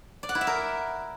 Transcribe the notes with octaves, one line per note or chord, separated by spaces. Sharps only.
D5
F#5
E4
E5
A#4